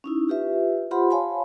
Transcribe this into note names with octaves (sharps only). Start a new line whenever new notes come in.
C#4 D#4 E4
F4 G4 B4 E5
F4 G4 C5 F#5 B5 C6
C#5 F5 G#5 A5 B5 C6